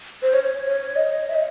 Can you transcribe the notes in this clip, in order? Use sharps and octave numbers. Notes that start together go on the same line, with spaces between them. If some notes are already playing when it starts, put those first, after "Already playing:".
C5
C#5
C#5
D#5
E5
D#5